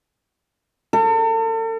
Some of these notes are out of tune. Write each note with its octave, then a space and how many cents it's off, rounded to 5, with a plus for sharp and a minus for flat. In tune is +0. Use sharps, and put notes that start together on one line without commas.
A4 +40